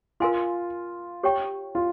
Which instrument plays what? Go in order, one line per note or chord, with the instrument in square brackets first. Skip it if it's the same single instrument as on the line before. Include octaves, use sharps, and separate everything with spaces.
[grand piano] F4 [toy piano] A#4 F5 G#5 C6
[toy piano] G4 C#5 G5 C#6
[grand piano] F4